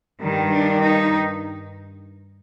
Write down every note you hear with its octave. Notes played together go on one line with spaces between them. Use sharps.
G2 D#3 G3
D4
D#4